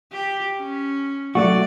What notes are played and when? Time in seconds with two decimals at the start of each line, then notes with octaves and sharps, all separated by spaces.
0.13 G4
0.58 C#4
1.35 F#3 A3 F#4 D5